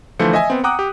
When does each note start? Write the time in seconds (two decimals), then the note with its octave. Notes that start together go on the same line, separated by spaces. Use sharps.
0.19 D3 E3 F3 A3 C5 C#7
0.33 D#5 E5 G#5
0.50 B3 C4
0.64 F#5 G5 A#5 D6 D#6 F#6
0.79 G4